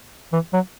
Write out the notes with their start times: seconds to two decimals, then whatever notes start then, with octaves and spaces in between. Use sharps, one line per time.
0.33 E3
0.53 F#3